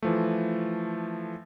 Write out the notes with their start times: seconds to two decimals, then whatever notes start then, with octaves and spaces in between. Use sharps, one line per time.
0.03 E3 F3 A3